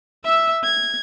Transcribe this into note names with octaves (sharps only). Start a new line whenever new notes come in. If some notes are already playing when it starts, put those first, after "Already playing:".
E5 E6
G#6